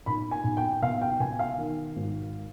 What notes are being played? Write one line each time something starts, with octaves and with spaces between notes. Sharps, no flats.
B1 B5
G#5
B1
G5
B2 F5
G5
B2 G#5
F5
D#3
G#1